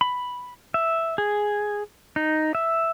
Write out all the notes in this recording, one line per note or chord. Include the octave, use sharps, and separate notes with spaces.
B5
E5
G#4
D#4
E5